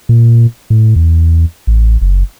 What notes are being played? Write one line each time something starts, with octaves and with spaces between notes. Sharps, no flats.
A#2
A2
E2
A1
F#1